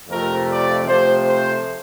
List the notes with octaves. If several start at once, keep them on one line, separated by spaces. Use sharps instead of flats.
F2 C3 F3 A3 A#4
D5
C3 F3 A3 C5
C5